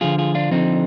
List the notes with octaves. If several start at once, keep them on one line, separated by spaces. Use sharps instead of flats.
D3 F3 F4 G#4
F4 G#4
D4 F4
D3 F3 C4 D#4